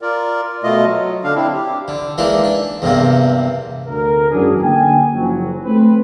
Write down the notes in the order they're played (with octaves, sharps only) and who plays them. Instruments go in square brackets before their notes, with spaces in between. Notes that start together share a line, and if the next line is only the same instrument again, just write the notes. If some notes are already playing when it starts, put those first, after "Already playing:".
[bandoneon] F4 A#4 D5
B2 A3 F4 D#5
F#3
D3 D4 F5
C4 D4 E4
G4
[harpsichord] D3
E3 G#3 A#3 D4 D#4
D4
E2 G2 C3 A#3
[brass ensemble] D2 A#4
G#1 F#2 E3 F#3 D4 G#4
D3 A#3 G5 G#5
F#1 F3 F#3
A3 C4 B4